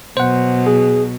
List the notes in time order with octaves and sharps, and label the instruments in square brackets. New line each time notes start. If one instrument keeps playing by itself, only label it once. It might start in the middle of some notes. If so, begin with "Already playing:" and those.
[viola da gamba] B2 F#3 [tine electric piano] C5 F#5
[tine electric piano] G#4